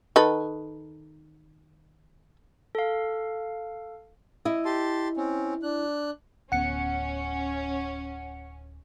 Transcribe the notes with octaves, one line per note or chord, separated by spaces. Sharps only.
D#3 A4 B4
A4 F5
E4 D#5
G4 A5 C6
C4 C#4
D4 F#6
D1 B3 C#4 F#5 C#7